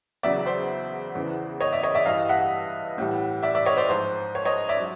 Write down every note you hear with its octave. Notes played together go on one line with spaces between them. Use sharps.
E2 C#3 F#3 D5 E5
C5 D5
E2 C#3 E3
C#5 D#5
D5 E5
C#5 D#5
D5 E5
G2 E3 G3 D#5 F5
E5 F#5
A2 E3 G3
D5 E5
D5 E5
C#5 D#5
C5 D5
G#2 F3 C5
C#5
C#5 D#5
D5 E5
F#3